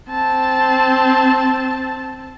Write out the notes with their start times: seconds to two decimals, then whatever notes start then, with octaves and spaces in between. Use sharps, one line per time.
0.10 C4 A5